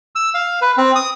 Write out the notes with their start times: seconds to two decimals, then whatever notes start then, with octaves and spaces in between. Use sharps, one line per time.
0.15 E6
0.34 F5
0.61 B4
0.78 C4
0.95 D#6